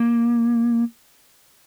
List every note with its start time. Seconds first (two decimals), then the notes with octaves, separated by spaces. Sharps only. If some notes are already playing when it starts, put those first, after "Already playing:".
Already playing: A#3